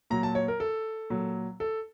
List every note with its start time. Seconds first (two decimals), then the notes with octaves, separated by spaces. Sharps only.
0.10 A#2 F#3 A#5
0.23 A5
0.35 C#5
0.48 A#4
0.60 A4
1.10 A#2 F#3
1.60 A4